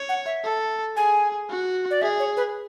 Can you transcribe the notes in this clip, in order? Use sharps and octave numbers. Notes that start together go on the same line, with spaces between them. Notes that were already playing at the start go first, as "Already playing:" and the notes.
Already playing: C#5
F#5
E5
A4
G#4 G#5
F#4
D5
G#4 E5
C#5
B4